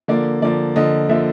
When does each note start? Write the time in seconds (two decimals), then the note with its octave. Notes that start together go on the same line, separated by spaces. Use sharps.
0.08 D3 F3 A#3 D5
0.42 D3 F3 A#3 D5
0.76 D3 F3 A#3 D#5
1.09 D3 F3 A#3 E5